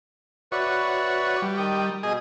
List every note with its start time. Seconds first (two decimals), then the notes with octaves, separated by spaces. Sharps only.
0.52 F#4 B4 C#5 D5 E5
1.42 G3
1.58 D#3 D#6 G6
2.03 B2 G#4 D#5